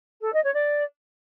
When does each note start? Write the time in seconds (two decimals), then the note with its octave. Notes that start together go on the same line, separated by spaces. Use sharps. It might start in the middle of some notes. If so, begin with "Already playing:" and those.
0.21 A4
0.32 D#5
0.43 C#5
0.54 D5